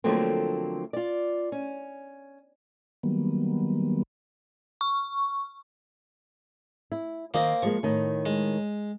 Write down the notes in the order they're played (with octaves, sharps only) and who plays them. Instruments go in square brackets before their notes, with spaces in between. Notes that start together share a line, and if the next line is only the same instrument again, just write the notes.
[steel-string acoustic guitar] D3 F3 F#3 A3 A#3 C4
F4 D5
C#4
[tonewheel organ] D#3 F#3 G3 A#3 B3
[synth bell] C#6
[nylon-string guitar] E4
[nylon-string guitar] D#3 D#5 [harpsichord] A#3 C4
[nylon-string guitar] F3 G#3 A#3 [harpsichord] C#6
[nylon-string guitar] A2 D#3
[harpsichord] G#3